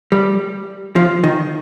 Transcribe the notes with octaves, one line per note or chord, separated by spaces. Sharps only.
G3
F3
D#3